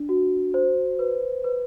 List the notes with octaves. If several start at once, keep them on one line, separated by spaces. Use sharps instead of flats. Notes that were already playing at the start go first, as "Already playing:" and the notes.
Already playing: D4
F#4
C5
B4
B4